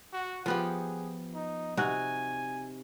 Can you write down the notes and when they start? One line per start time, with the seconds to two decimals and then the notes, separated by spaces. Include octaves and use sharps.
0.13 F#4
0.46 F3 B3 G4 G#4
1.34 D#4
1.77 C3 D#4 F#4 G#5